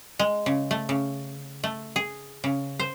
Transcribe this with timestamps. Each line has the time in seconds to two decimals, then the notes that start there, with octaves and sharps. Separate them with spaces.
0.19 G#3
0.46 C#3
0.71 A3
0.89 C#3
1.64 A3
1.96 G#4
2.44 C#3
2.79 C5